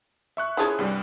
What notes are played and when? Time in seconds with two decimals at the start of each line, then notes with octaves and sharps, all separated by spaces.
0.37 E5 C#6 F#6
0.57 C#3 F3 E4 G#4 C#5
0.79 C2 G2 G3